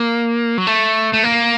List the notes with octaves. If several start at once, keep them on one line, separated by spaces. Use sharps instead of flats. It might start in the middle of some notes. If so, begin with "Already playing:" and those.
Already playing: A#3
F#3
A3
A3
A#3